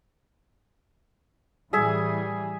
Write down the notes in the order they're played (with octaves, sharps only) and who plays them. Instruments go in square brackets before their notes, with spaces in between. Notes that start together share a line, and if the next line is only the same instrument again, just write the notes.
[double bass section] A2 E3 G3 [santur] G#4 E5 G#5